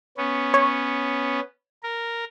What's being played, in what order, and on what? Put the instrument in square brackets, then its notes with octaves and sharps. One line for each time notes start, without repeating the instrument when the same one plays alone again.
[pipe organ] B3 C#4
[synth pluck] C#5
[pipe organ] A#4